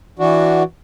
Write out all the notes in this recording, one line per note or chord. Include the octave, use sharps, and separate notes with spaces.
E3 D4 F#4